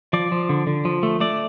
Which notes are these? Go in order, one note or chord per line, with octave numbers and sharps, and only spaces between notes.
F3 D5
F3
D3
D3
F3
A3
A3 D5